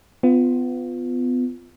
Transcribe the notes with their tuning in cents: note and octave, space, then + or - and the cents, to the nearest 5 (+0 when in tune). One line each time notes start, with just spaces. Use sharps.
B3 +30 F4 +0